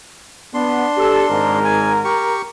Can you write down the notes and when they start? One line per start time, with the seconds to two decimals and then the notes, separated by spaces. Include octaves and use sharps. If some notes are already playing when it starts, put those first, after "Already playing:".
0.54 B3 D4 C6
0.97 G4 A4
1.30 G#1 G#2 A#4
1.65 G#5
2.05 G4 C#6